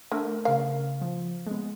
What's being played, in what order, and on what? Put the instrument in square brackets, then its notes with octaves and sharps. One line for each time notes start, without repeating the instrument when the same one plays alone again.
[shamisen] D3 [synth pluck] A3 A#4
[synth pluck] C#3 A#4 [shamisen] F5
[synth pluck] F3
G#3 B3